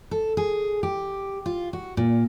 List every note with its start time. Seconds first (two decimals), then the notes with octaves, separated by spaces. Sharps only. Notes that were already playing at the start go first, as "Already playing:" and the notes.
0.11 A4
0.37 G#4
0.83 G4
1.46 F4
1.73 F#4
1.97 A#2